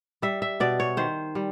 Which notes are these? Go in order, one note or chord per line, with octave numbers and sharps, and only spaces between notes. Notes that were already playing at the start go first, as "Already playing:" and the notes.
G3 E5
E5
B2 D5
C#5
D#3 C5
G3